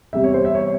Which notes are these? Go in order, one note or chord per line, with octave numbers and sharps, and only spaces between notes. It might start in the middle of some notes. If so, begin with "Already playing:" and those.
E2 C3 G3 E5
C#5
C5
E5
C#5